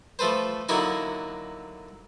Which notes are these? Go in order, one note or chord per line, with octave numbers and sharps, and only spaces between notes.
F3 A3 A4 B4 C5
D3 F#3 A#3 D#4 E4 F#4